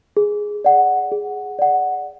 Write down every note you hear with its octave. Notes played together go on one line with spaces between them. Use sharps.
G#4
D5 F#5
G#4
D5 F#5